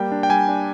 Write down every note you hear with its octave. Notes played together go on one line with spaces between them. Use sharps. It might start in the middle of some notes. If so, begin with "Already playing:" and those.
Already playing: G3 A#3 G5
D4
G5
G3 G#5
D4